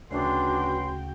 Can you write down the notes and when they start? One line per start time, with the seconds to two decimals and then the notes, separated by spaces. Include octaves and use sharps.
0.11 D2 C#3 C#4 D4 F#4 B4 G5 C6